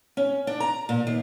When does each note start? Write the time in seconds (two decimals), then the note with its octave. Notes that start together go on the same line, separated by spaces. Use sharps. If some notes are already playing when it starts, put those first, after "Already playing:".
0.17 C#4
0.47 D4
0.60 A#5
0.89 A#2
1.07 D#2